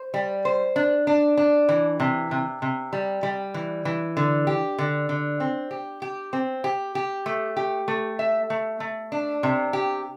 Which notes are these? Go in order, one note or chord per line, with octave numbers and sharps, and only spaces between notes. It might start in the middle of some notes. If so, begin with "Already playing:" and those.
Already playing: C5
G3
C5
D4
D4
D4
E3
C3
C3
C3
G3
G3
E3
E3
D3
G4
D3
D3
C4
G4
G4
C4
G4
G4
A3
G4
A3
E5
A3
A3
D4
C3
G4